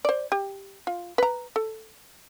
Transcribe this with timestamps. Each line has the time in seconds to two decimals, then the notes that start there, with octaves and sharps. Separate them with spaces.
0.05 C5 D5
0.32 G4
0.87 F4
1.18 B4 A#5
1.56 A4